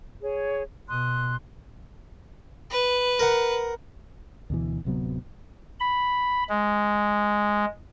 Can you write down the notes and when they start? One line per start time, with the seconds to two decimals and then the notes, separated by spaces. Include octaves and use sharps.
0.21 G#4 C#5
0.88 B2 C6 D#6 F#6
2.70 B4
3.19 A#4 F#5
4.50 D2 B2 E3
4.85 D1 C3 F#3 B3
5.80 B5
6.49 G#3